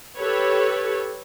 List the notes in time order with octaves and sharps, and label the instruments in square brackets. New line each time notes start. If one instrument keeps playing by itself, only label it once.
[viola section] G4 A4 B4 C#5